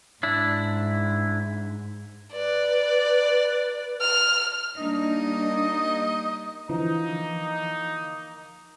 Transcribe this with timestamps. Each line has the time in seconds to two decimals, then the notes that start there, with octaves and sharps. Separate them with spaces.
0.23 G#2 D4 E4
2.33 B4 D5
4.01 F6
4.77 G3 A#3 D4 D#4 D#5
6.69 D3 E3 F3 A#3 D#4